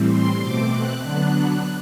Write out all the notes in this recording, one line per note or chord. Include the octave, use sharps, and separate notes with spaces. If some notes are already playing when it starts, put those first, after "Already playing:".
Already playing: A2 E3 G3 C4
C6
B2 A3 C4 D6
F#6
D3 F#3 B3 D4 F#6